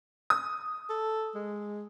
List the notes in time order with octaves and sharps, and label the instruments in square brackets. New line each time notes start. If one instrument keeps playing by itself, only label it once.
[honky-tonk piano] D#6
[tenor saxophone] A4
G#3